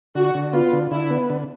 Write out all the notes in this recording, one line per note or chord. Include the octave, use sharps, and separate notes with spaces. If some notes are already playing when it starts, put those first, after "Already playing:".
D3 F#4
D3
B3 F4
D3
D3 E4
B3
D3